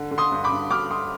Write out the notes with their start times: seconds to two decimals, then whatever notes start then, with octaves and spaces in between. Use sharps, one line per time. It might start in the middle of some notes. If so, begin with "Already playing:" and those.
Already playing: D3
0.11 D3
0.18 C6 D#6
0.32 G2
0.44 B5 D6
0.52 G2
0.71 D3 D6 F6
0.90 D3 C6 D#6